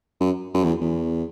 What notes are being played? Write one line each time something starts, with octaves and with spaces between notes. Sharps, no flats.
F#2
F#2
E2
E2